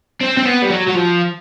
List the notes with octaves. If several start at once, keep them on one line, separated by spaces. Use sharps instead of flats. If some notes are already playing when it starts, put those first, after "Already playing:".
C4
C4
B3
G3
F#3
F#3
F3